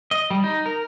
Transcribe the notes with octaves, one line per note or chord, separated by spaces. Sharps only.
D#5
G3
D#4
A#4